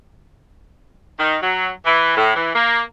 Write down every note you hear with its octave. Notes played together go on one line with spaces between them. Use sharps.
D#3
F#3
E3
A2
E3
A#3